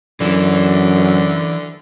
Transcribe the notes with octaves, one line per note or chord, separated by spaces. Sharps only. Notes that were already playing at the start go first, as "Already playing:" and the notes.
F#2 D3 E3